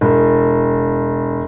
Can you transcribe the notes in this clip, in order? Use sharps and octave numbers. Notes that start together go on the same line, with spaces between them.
E1